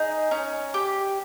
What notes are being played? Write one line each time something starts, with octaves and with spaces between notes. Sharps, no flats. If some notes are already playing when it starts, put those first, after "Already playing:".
Already playing: D#4 G#4
C#4
G4